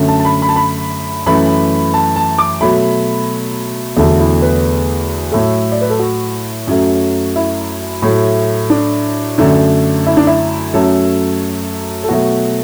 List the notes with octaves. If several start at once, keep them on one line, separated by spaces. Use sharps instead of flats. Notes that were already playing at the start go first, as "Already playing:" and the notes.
Already playing: F#2 D3 A3
A5
A5
B5
B5
A5
B5
F#2 E3 A3 B5
A5
A5
D6
B2 F#3 A3 B5
E2 D3 F#3 A3 A4
E4
B4
A2 F#3 A3 A4
D5
B4
A4
F#4
F#2 F#3 A3
E4
A2 F#3 A3
D4
F#2 D3 F#3 A3
E4
D4
E4
F#2 F#3 A3 A4
A4
B2 F#3 A3 F#4